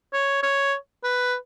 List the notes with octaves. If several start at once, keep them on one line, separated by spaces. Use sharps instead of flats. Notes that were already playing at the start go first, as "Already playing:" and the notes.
C#5
C#5
B4